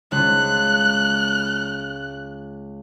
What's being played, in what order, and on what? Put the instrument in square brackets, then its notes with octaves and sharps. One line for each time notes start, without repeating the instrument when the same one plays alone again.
[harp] C#2 [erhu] F#6